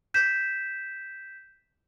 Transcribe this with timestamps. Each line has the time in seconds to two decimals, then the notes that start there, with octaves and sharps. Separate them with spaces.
0.14 G6 B6 E7